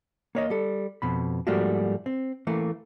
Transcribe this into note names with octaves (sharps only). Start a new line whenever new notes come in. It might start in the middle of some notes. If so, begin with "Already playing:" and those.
A#3 C#5 D#5
G3 A4
F2 B2 B5
G#2 F3 G3 A3 A#3 F#4
C4
E3 A3 A#3